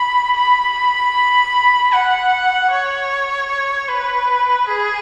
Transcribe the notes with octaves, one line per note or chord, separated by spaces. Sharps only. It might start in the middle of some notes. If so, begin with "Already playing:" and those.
Already playing: B5
B5
F#5
C#5
B4
G#4